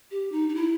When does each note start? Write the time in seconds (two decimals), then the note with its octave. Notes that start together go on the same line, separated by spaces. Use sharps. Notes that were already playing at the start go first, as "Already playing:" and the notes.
0.11 G4
0.32 D#4
0.49 D#4
0.55 E4